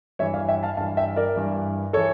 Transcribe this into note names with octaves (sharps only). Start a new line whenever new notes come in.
G2 E3 C#5 E5
D5 F5
E5 G5
F5 A5
G2 E3 F5 A5
E5 G5
A#4 D5
G2 E3
E3 A4 C#5